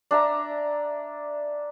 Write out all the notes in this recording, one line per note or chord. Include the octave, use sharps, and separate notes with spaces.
D4 E5 A#5